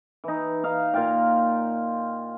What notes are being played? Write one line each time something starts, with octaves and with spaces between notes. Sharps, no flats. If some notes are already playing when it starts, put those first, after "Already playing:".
E3 D#4
D#4 F5
A#2 F4 F5 G5